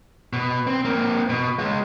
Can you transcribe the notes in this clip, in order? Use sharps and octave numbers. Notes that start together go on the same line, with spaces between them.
B2
C4
A#3 C4
B2
G#3 F4